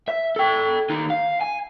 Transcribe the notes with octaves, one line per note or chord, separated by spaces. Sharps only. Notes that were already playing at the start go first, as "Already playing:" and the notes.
E5
A4 G5
D#2 D#4
F5
G#5